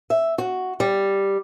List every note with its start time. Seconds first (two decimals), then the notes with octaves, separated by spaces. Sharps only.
0.10 E5
0.38 F#4
0.80 G3